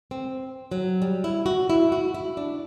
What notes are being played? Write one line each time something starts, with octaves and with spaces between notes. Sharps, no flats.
C4
F#3
G3
E4
F#4
E4
F#4
E4
D4